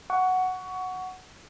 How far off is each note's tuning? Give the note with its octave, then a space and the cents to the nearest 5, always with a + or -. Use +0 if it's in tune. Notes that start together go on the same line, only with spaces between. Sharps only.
F#5 +0 C#6 +20